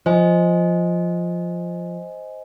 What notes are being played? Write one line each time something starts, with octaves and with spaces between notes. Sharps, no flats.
F3 C5 D#5 G#5